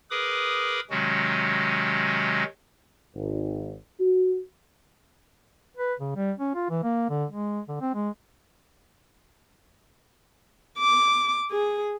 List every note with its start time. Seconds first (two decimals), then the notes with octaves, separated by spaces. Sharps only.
0.11 G#4 A#4 B4 B5 D6 D#6
0.90 C3 D#3 F#3 G#3 C#4 F#4
3.16 G#1
3.99 F#4
5.77 B4
6.00 C#3
6.16 G3
6.38 C#4
6.55 F4
6.70 E3
6.83 A#3
7.10 D3
7.31 G#3
7.68 D3
7.81 C4
7.94 G#3
10.79 D6
11.51 G#4